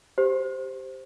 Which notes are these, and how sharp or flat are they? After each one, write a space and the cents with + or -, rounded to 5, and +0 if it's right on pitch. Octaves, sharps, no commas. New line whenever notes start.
G4 +0 C5 +0